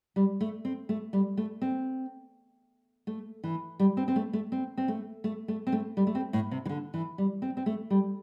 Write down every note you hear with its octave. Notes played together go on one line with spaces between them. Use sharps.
G3
A3
C4
A3
G3
A3
C4
A3
E3
G3
C4
C4
A3
A3
C4
C4
A3
A3
A3
C4
A3
G3
A3
C4
A2
C3
E3
D3
E3
G3
C4
C4
A3
G3